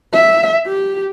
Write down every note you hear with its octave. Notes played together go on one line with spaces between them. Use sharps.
E5
G4